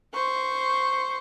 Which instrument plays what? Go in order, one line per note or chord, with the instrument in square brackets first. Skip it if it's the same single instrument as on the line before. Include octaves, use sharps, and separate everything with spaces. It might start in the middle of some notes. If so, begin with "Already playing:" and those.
[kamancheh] C5 C#6